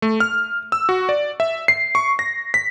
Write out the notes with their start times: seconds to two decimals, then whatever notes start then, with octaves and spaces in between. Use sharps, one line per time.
0.02 A3
0.20 F6
0.72 E6
0.89 F#4
1.09 D5
1.40 E5
1.68 C7
1.95 C#6
2.19 A#6
2.54 B6